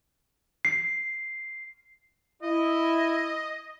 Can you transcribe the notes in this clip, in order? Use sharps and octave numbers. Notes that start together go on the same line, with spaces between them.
C7
E4 D#5